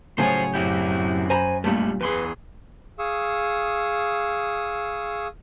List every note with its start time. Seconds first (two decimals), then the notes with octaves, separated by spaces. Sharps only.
0.18 A2 C#3 F#3 F4 G#4 C5 C#5
0.54 F#2 C4 E4 G4
1.30 C5 G#5 A#5 B5
1.64 G2 A#2 G3 A3
2.01 E2 G#4 B4 C6
2.99 G#4 F5 C#6 D#6 E6